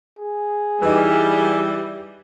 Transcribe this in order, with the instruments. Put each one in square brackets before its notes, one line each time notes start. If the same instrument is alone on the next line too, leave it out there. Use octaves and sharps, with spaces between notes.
[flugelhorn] G#4
[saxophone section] E3 [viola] G3 [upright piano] D#4 B4